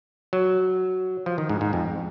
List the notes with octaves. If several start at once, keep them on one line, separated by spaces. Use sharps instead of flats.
F#3
F3
D#3
G#2
G#2
F2